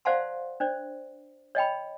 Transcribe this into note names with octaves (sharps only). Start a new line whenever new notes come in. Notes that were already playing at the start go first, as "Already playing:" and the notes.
C5 D5 F5 F#5 A5 C6
D4 C5 D5
C#5 D#5 G5 B5